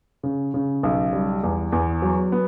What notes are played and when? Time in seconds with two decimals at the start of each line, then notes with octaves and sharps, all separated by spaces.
0.23 C#3
0.54 C#3
0.83 B1
1.13 G3
1.44 E2
1.72 E2
2.02 F#3
2.32 B3